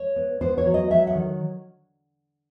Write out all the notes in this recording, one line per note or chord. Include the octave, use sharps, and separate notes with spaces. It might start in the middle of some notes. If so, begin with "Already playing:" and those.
Already playing: C#5
B3
B3 C5
C#5
F#3
D#5
F#3 E5
F#5
D#3